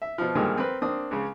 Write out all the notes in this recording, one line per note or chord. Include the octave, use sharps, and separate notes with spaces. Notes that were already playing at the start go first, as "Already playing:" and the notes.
E5
B2 F3
G2 A#2 D3 D#3 F3 G#3
C4 A#4 B4
A#3 C4 D4 D#6
C#2 C#3